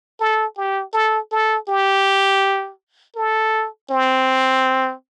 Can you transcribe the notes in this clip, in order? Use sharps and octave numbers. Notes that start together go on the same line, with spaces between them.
A4
G4
A4
A4
G4
A4
C4